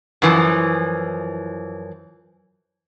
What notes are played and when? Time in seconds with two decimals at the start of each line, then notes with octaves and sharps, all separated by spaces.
0.22 F#2 E3 F3